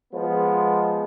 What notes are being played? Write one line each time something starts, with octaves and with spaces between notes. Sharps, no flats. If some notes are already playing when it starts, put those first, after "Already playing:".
F3 G#3 B3